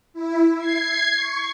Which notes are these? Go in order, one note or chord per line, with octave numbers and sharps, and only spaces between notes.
E4
G#6 C7
C#6